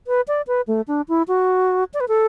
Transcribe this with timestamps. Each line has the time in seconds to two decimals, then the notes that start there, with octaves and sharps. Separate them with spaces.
0.07 B4
0.28 D5
0.47 B4
0.67 A3
0.88 D4
1.09 E4
1.28 F#4
1.94 D5
2.00 B4
2.08 A4